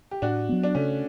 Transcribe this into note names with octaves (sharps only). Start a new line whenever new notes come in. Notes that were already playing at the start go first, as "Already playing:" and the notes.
G4
A2 D4 F#4
F#3 B3
D4
C#3 A3 C#4